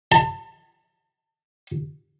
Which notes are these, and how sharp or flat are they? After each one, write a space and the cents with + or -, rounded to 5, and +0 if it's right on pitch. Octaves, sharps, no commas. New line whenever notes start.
A5 +30